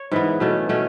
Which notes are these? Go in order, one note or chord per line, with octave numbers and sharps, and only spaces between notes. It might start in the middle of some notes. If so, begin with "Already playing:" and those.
Already playing: C#5
G#2 E3 B3
B2 A3 C#4
B2 A3 C#4